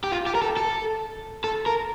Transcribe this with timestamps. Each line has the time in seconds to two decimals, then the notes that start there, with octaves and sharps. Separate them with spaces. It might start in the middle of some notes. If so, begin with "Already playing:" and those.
0.04 G4
0.12 F4
0.27 G4
0.35 A#4
0.42 A4
0.57 A4
1.44 A4
1.66 A#4